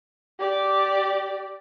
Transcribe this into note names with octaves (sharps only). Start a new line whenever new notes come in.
G4 D5